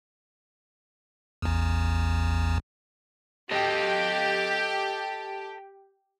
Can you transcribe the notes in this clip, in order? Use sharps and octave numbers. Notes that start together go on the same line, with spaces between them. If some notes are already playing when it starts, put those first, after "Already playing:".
A1 E2
G4 A4 D#5